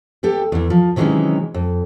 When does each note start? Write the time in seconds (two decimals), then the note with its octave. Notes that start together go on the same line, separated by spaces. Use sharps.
0.23 G3 B3 G4 A4
0.52 E2 E3
0.70 F3
0.96 C3 D#3 E3 F#3 G#3 C#4
1.54 F2